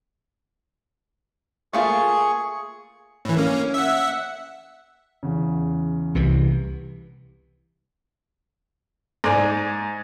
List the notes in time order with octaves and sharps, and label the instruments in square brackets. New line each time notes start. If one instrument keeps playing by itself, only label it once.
[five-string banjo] A3 A#3 F4 [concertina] G#4 C#6
[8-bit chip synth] A2 E3
A#3 C#4
E5 F#5
[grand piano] E2 C#3
[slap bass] C2 C3 E3
[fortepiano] G#2 D5 G#5 A#5